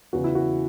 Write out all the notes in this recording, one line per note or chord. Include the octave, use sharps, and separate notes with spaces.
E2 C#3 E3 F#4
E4
F#4